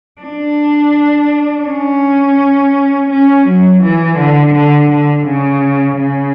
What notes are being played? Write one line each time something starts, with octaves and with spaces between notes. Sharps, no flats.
D4
C#4
C#4
F#3
E3
D3
D3
D3
C#3
C#3